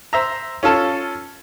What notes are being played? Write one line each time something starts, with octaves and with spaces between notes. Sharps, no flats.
C5 E5 A#5
C#4 F4 A4 A5